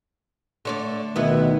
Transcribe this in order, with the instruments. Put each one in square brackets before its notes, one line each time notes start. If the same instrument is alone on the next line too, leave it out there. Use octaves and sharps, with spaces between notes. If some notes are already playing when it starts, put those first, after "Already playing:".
[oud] D3 C#5 D5 [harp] A3 C6
[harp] D2 F4 E5 [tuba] B2 [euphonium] D#3 [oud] B3 E4 B4